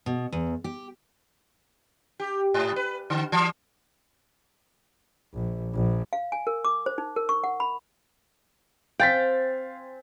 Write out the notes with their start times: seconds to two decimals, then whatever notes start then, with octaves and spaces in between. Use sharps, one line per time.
0.06 B2
0.32 E2
0.64 G4
2.20 G4
2.54 G#2
2.76 B4
3.10 D3
3.32 E3
5.33 A#1
5.73 A#1
6.13 F5
6.32 G#5
6.47 A#4
6.65 D6
6.86 C5
6.98 D#4
7.16 A#4
7.29 C#6
7.44 F#5
7.60 B5
9.00 C4 C5 F5 G5 G#5 A6 B6